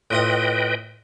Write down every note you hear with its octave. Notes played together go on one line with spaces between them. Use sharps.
A2 F4 B4 D#5 G5 D#6